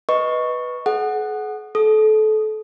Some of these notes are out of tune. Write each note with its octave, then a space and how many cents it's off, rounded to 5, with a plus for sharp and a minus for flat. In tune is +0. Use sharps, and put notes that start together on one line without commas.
B4 +0 D#5 +5 C#6 +0
G#4 +45 F#5 +0
A4 -25 D#6 +0